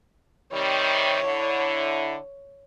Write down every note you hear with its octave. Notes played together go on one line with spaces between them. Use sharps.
C3 D#3 G3 C#5
D3 E4